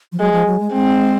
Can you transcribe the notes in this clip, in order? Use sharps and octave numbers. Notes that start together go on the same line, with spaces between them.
F3
F#3 G#3
F3
F#3
G#3
G#3 C4